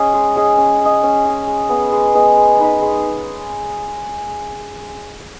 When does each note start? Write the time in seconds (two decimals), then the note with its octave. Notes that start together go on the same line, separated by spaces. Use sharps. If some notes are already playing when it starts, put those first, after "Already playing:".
Already playing: C#4 G#4 D#5
0.14 G#3
0.35 C#4 G#4 D#5
0.58 C#4
0.80 G#4
0.85 D#5
1.03 C#4
1.25 G#4 D#5
1.47 G#3
1.69 B3 G#4 D#5
1.92 G#3
2.14 B3 G#4 D#5
2.37 G#3
2.59 D#4 B4 D#5
2.82 G#3